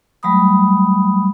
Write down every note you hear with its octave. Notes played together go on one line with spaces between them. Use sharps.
F#3 G3 A3 B5 D#6